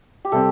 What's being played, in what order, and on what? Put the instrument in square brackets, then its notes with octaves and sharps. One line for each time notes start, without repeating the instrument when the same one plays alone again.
[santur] G4
[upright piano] C3 G3 C4 [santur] A4